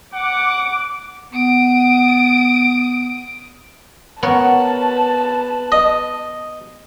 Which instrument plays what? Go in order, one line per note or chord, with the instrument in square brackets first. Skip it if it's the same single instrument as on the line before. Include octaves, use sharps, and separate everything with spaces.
[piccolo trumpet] F#5 [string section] D6
[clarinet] B3 [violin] D#6 D7
[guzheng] B3 A#4 C#5 [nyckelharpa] B4 [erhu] A5
[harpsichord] D#5